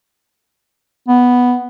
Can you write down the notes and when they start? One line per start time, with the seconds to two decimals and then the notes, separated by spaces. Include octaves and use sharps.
1.08 B3